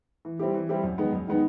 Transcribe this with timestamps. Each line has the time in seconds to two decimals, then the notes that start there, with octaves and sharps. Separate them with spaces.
0.25 E3
0.39 G3 C4 E4 G4
0.54 E3
0.69 G3 C4 E4 G4
0.84 F#2
0.98 D#3 G#3 B3 D#4
1.13 F#2
1.27 D#3 G#3 B3 D#4